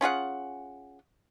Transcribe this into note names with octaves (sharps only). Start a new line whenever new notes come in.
C#4 F4 G#4 F#5